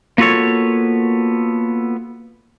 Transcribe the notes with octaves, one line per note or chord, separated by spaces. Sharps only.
A#3 B3 F4 F#4 A4 C#5